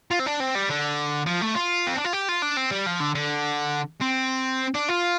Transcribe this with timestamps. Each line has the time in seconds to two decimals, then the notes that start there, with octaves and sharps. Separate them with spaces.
0.11 F4
0.20 C4
0.26 D4
0.40 C4
0.55 G3
0.70 D3
1.27 F3
1.42 A3
1.55 F4
1.87 C4
1.96 D4
2.05 F4
2.13 G4
2.29 F4
2.42 D4
2.57 C4
2.71 G3
2.86 F3
3.00 D3
3.15 D3
4.01 C4
4.74 D4
4.89 F4